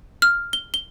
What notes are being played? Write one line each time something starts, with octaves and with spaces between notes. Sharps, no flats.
F6
G7
G7